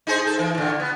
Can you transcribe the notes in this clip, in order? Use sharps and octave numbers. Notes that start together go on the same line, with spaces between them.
D#4 G#4 C5
A4
E3
A#2 D3
B3